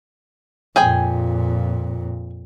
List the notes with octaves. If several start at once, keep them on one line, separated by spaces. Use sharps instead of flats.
F2 A#2 G#4 G5 G#5